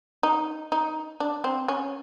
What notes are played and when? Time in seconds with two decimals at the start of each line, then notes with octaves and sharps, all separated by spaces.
0.23 D#4
0.72 D#4
1.20 D4
1.44 C4
1.68 C#4